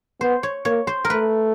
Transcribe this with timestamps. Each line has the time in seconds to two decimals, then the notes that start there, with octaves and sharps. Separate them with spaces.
0.21 B3 C5
0.43 C#5
0.65 A#3 C#5
0.87 C5
1.05 A#4
1.10 A3 B4